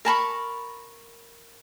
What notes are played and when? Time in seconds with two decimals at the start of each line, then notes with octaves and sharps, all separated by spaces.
0.05 A#4 A5 B5 C#6